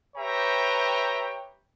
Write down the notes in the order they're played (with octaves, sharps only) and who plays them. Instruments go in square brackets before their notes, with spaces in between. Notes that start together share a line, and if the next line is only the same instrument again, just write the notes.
[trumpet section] G4 B4 C#5 E5 G5 A#5